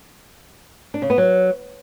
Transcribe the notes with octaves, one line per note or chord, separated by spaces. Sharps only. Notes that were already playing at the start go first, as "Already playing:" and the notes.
D4
C#3
B3
F#3